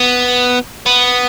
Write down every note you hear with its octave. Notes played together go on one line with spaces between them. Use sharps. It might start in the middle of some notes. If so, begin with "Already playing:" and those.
Already playing: B3
B3